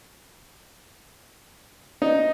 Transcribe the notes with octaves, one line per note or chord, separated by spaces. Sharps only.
D#4